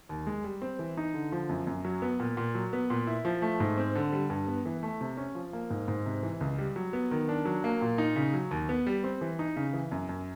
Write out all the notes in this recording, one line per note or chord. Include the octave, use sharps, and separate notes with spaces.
D#2
G#3
G3
C4
E3
D#4
D3
F3
F#2
F#2
F#3
B3
A#2
A#2
F#3
B3
A#2
E4
F3
A3
G#2
C4
D3
G3
G2
B3
E3
A3
C3
C#4
F3
A#3
G#2
G#2
C3
E3
C#2
G3
F#3
B3
D#3
D4
F#3
A#3
A#2
D#4
C#3
F#3
D#2
B3
G3
C4
E3
D#4
C#3
E3
F#2
F#2